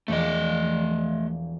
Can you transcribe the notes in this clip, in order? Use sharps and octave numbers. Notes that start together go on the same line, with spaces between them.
E1 F3 A3 D5 D#5